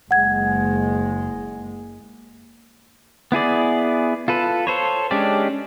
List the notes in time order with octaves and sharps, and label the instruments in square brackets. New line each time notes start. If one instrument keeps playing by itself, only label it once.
[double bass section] F#1 G#3 [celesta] F#5 G#6
[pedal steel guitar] B3 E4 G#4 D5
F4 A4 B4
A4 C5 C#5
G#3 C#4 D4 G4 D5